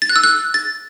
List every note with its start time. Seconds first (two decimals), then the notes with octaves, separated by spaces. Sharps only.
0.02 A6
0.09 F#6
0.16 E6
0.23 F#6
0.54 A6